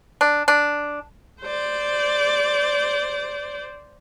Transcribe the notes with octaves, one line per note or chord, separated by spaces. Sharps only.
D4
D4
C5 D5